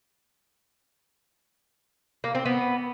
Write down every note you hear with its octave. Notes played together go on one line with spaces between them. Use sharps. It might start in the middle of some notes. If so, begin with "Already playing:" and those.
A#3
C4
B3